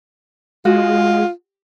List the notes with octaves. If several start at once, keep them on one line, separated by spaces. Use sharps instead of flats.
G#3 F4 F#4